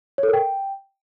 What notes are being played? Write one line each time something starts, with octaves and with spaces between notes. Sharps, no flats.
C#5
A4
A#4
G5